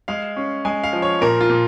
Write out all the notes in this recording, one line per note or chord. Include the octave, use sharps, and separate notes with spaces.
G#3 F5
C#4
G#3 G#5
F5
F3
C#5
A#2 A#4
F4
A#2